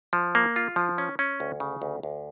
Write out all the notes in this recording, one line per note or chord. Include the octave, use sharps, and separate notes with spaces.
F3
A#3
F4
F3
C#4
C#4
D2
C#3
D2
D2